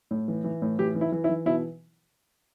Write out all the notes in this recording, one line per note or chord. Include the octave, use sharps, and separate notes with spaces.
A2
E3
E3
A2
E3 G4
E3
E4
E3
E4
E3
B2 E4